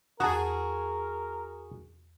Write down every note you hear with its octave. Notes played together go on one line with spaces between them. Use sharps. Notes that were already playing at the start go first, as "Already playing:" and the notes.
E2 F#4 G#4 A#4 F#5 A5 A#5 D#6